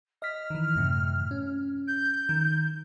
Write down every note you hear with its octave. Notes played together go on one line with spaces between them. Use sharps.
D#5 F6 B6
D#3 E3
F#2 A2 C3
C#4
G6
D#3